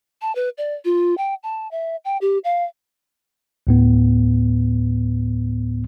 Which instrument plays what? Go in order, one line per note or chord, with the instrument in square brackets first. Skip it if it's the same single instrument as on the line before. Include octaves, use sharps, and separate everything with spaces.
[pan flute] A5
B4
D5
F4
G5
A5
E5
G5
G4
F5
[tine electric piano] D2 A2 B3